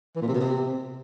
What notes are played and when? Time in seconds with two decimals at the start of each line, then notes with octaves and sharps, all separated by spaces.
0.15 E3
0.22 A#2
0.28 C3
0.34 B2
0.41 C3